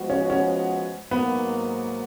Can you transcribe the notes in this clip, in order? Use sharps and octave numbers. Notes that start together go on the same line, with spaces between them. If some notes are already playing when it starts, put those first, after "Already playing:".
Already playing: F3 G#3 B3 F#4
C#4
C#4
G#2 F#3 A#3 B3